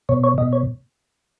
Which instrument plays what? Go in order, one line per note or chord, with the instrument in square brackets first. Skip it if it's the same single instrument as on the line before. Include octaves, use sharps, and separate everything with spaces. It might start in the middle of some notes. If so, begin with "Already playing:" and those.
[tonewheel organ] B2 C#5
C#5
B2 D#5
C#5